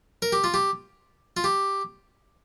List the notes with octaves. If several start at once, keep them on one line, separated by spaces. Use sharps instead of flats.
A#4
G4
F4
G4
F4
G4